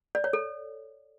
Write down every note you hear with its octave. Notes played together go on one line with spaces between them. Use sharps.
D5
C#5
A4